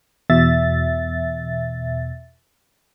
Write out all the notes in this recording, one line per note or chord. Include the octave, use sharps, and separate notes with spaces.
E2 B2 E5 A6